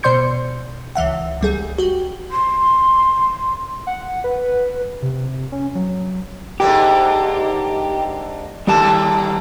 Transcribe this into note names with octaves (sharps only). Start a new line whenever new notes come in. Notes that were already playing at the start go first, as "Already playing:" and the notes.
B2 C5 D5 C6 G6 C#7
C#2 E3 E5 F#5
C#2 G3 G#4
F#4 G4
C6
F#5
B4
C3
C#4
F#3
G#2 D3 A#3 G4
D#2 D3 G3 A#3 G4 A5